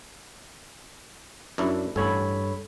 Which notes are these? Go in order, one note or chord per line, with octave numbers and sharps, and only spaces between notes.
F#2 D4 E4
A1 G2 G3 A4 C#5 B5